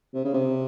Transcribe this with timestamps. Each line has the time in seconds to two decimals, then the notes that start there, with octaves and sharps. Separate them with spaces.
0.14 C3
0.24 C#3
0.33 C3